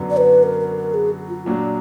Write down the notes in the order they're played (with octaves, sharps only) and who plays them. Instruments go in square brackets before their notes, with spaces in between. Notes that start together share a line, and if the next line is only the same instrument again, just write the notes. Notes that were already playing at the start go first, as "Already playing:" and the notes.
Already playing: [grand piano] F#2 D3 F#3 B3 D4
[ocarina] D5
B4
A#4
A#4
A#4
G#4
F4
[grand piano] A#2 F#3 D4